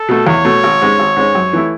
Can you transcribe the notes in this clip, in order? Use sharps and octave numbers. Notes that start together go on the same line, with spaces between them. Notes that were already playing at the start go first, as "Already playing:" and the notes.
Already playing: A4
B2 A3
E2 C#5
B2 A3
G#1
G#2 G#3 C#4
G#1
G#2 G#3 C#4
F#2
E3 A3 E4